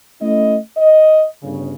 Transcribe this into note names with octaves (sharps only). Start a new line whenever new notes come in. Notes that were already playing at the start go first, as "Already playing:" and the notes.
A3 C#4 E4 D#5
D#5
G1 C#3